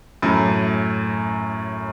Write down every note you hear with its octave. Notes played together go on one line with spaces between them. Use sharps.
F#2 A2